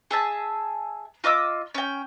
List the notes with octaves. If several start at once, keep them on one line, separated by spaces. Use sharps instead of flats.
G#4 E5 A5
F4 D#5 D6 E6
C#4 G5